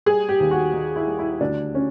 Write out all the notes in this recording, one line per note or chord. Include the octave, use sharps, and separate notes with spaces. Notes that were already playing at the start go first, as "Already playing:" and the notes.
G3 G#4
G4
D#2
F#4
D#3
E4
G3
E4
D2 D4
C#4